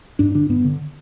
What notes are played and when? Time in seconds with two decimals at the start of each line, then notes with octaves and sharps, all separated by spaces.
0.19 G2 D4
0.35 D3 D4
0.49 G2 B3
0.65 D3